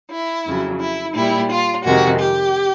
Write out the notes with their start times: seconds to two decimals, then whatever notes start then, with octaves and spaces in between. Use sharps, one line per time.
0.11 E4
0.45 F2 C#3 F#3
0.80 E4
1.15 A#2 G3 E4
1.50 F4
1.84 F2 C3 D#3 G#3 F#4
2.19 G4